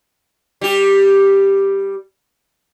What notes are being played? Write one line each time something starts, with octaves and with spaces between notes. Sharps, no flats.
G3 G4